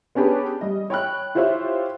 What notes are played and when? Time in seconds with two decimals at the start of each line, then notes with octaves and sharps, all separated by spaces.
0.15 B3 C#4 D4 G4 G#4 B4
0.61 G3 D#5
0.90 C#5 G5 B5 F#6
1.35 E4 F4 G4 C5 C#5 E5